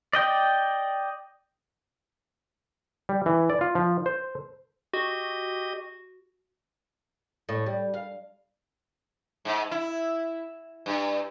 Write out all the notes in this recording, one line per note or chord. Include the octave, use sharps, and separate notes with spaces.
D5 D#5 G5
G3
E3
D5
F4
F3
C5
F#4 G4 D#5
A2
G3
F5
G#2
E4
G2